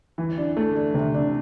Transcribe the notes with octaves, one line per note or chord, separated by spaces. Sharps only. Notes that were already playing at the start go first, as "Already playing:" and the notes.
E3
D4
A3
D4
C3
D4